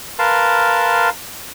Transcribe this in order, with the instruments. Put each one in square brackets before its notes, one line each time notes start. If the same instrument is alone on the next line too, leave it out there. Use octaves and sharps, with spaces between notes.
[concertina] A#4 B4 F5 A5 C6